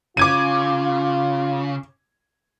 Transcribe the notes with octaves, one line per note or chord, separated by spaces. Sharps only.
C#3 F4 D6 G#6 D#7